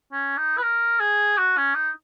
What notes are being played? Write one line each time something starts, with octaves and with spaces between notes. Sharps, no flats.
C#4
D#4
B4
A#4
G#4
F#4
C#4
D#4